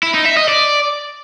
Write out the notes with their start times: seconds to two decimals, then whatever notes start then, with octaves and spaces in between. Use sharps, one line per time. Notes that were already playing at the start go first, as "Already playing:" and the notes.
0.03 E4
0.14 D#4
0.25 E5
0.37 D#5
0.48 D5